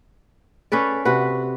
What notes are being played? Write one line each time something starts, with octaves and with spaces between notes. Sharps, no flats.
C#4 A4 B4 D5
C3 F#4 B4